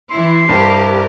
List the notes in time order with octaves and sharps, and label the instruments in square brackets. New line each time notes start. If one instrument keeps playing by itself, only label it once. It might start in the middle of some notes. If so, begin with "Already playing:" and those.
[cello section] E3 E4 [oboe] C6
[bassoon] C2 [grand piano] G2 [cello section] G4 A#4